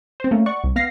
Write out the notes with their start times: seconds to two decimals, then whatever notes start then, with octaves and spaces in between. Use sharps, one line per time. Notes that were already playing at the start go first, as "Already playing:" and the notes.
0.20 C4 C5
0.31 A3 A#3 C#4
0.46 D5 F#5 C#6
0.64 C2
0.76 B3 F5 A#6 C7